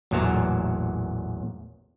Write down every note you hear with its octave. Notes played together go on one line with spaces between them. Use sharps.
A1 E2 A#2 F#3 A5 A#5